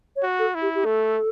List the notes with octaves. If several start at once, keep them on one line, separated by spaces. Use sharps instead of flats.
C#5
F#4
A4
E4
G4
G4
A3 A4